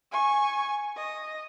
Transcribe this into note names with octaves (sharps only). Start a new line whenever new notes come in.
G#5 C#6
D#5